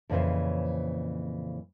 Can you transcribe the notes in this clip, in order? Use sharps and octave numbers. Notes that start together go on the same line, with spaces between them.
F2 A#2 C#3 E3 C#4 C5